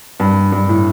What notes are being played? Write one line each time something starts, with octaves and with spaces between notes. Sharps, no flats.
G2
G2
A2